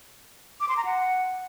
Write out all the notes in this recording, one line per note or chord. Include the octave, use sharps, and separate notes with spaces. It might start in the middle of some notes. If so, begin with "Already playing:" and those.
D6
C6
A#5
F#5